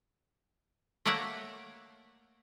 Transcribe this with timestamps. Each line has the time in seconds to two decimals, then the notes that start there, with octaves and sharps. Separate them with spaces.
1.05 A3 A#3 C#5 D5 E5 F#5